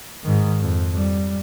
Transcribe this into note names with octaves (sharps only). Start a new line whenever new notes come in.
G#2 D#3
F2
G3